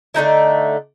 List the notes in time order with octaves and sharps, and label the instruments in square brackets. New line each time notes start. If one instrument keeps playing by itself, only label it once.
[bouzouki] D3 A3 D#4 E4